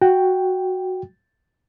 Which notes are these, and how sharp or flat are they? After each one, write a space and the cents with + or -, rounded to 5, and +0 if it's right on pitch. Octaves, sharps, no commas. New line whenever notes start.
F#4 +0 G5 +0